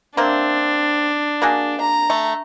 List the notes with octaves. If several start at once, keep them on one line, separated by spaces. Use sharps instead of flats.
A#3 C4 D4 E5
A#3 F#4 G#4
A#5
A3